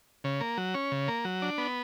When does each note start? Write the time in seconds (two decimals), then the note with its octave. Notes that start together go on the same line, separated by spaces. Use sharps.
0.24 C#3
0.40 A#3
0.58 F#3
0.74 C#4
0.92 C#3
1.08 A#3
1.25 F#3
1.42 D4
1.58 B3